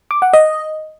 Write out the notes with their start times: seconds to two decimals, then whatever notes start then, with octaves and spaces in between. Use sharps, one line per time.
0.11 D6
0.22 F#5
0.33 D#5